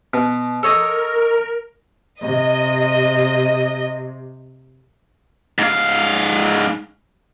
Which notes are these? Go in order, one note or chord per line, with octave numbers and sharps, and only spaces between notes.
B2
A4 A#4 C#5 D#5
C3 D#5
G#2 F5